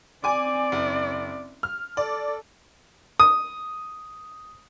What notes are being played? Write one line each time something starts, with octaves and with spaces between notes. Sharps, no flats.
C4 D5 G#5 D6
F#1
F6
A4 D5
D#6